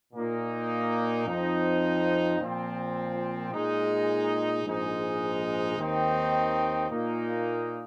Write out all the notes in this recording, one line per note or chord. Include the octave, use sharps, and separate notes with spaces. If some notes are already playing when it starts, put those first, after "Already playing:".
A#2 A#3 D#4
F2 F3 C4 D#4
A#2 F3 C4
A#2 G#3 D#4
A#1 G#2 G#3 D#4
D#2 D#3 C4 D#4
A#2 A#3 D#4